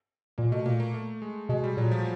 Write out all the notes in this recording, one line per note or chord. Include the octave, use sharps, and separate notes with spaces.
A#2 A#3
B2 A3
A#2 A#3
A#3
A3
G#3
B2 G#3
G3
A#2 F#3
F3